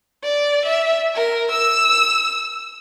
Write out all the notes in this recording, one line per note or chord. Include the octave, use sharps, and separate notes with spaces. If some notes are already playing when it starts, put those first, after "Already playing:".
D5
E5
A#4
E6